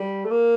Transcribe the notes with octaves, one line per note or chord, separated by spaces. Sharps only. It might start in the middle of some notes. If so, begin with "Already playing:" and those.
Already playing: G3
A3
A#3